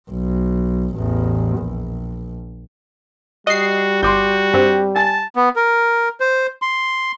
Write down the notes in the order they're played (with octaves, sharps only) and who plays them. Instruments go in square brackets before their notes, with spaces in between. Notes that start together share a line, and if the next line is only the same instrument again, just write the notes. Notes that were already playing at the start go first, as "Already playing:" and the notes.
[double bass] B1
A1 E2
A#1
[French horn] G3 [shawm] F#4 [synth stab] D#5 C7
[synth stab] G1 [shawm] F#4 [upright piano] C6 D6 G6
[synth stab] G2 C4 [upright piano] G4
[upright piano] G#5 A6 [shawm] A5
[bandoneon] B3
A#4
C5
C6